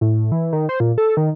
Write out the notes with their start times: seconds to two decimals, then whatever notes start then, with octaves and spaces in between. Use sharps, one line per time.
0.01 A2
0.32 E3
0.53 D#3
0.69 C5
0.80 A#2
0.98 A4
1.17 D#3